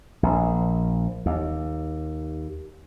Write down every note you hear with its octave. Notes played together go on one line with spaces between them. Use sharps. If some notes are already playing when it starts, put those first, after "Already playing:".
A#1
D#2